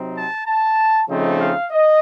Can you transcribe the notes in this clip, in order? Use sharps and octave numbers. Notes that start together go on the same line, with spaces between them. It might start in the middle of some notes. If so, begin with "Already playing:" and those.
Already playing: C3 F#3 C4 D#4
A5
A5
C#3 F3 A3 C4 D#4
F5
D#5